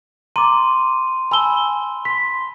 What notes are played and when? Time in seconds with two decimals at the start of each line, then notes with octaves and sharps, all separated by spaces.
0.36 A#5 C6 D6 D#7
1.31 G#5 A5 B5 E6 G7
2.05 C6 B6